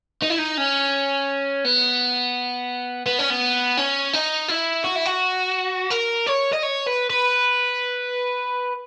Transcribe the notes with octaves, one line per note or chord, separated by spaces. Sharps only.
D#4
E4
D#4
C#4
B3
B3
C#4
B3
C#4
D#4
E4
F#4
E4
F#4
A#4
C#5
D#5
C#5
B4
B4